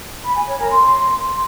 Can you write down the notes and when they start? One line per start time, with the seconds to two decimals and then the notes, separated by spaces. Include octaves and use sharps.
0.24 B5
0.36 G#5
0.48 C#5
0.59 A#4
0.71 C6